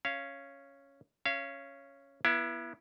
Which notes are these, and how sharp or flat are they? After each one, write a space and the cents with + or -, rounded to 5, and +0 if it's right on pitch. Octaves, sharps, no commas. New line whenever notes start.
C#4 +0 F5 -20
C#4 +0 F5 -35
B3 -25 E4 +25